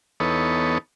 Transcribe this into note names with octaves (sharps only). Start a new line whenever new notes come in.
E2 B3 D#4 A4 C#5